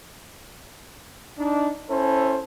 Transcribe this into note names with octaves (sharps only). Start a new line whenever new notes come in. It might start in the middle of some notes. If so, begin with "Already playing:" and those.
D4 D#4
C#4 E4 A4 C5